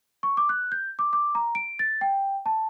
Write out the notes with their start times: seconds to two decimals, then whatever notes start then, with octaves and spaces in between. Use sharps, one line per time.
0.23 C#6
0.37 D6
0.49 F#6
0.72 G6
0.99 D6
1.13 D6
1.35 A#5
1.55 D7
1.79 A6
2.01 G5
2.46 A5